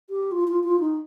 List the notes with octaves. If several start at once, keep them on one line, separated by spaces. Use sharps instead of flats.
G4
F4
F4
F4
D#4